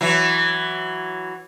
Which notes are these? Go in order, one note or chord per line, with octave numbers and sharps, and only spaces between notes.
E3 F#3